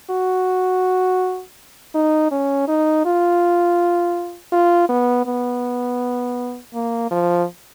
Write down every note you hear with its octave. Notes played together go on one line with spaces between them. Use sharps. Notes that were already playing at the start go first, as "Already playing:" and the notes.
F#4
D#4
C#4
D#4
F4
F4
B3
B3
A#3
F3